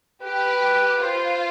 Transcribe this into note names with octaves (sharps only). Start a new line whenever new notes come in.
G4 B4
F4 C5